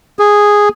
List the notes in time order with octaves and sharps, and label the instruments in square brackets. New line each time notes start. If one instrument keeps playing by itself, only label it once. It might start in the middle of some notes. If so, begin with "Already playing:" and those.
[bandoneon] G#4